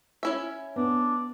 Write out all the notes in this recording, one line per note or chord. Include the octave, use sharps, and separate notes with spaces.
C#4 E4 E5
B3 D4